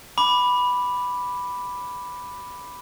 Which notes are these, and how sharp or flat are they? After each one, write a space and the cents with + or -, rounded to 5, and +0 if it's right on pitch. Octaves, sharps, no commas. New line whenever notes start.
B5 +0 D6 +0